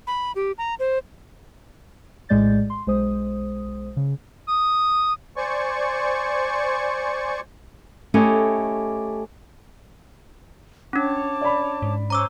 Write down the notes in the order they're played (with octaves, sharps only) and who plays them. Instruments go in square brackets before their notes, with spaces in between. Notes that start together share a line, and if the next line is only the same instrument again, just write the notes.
[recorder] B5
G4
A#5
C5
[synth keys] A#1 A2 G#3 D5 G6 A6
C6
B1 G#3 C5 D#6
C#3
[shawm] D#6
[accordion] C5 D5 G#5 C#6
[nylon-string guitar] A3 C#4 E4 G4 A4 D#5
[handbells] C#4 D4 [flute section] C#5 A5 D6
[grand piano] D5 B5
[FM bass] G#2
[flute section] C#4 C5 C#5 [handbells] A#5 D6 E6